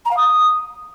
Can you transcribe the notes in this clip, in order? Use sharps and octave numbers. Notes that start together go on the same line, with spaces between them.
A#5
F5
D#6